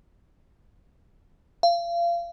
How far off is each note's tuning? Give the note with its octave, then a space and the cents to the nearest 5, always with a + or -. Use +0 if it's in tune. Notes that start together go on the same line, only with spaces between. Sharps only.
F5 -30